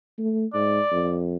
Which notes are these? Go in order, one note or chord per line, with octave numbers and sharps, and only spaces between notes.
A3
G#2 D5
F2